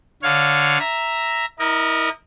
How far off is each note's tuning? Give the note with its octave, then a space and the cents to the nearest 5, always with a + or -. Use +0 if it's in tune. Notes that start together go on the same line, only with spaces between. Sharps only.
D3 +0 C#5 +0 F5 +0
E5 +0 A#5 +0
E4 -40 A#4 +10 D#5 -20